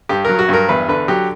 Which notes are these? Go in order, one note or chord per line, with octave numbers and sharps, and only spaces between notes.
G2 G4
F#3 A#4
F#4
G2 A#4
E2 B4
D3 B4
F#3 G4